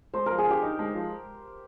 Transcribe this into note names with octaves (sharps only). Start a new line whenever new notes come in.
G#3 C5
F3 A#4
G#4
D3 G4
D#4
G#3
F3